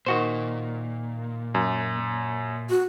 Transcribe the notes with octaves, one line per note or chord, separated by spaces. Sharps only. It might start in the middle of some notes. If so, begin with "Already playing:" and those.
A#2 D#3 F#4 C5
F#2
F#4